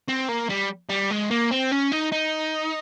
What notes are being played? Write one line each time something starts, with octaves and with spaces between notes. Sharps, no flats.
C4
A#3
G3
G3
G#3
A#3
C4
C#4
D#4
D#4